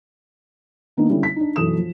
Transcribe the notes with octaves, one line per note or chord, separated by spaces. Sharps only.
D#3 A#3 B3 D4 D#4
D3 G3 C#4 E4
B6
D4 D#4
B1 F#2 E3 A4 D#6 E7
F3